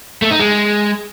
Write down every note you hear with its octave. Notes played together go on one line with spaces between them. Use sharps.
A3
D#4
G#3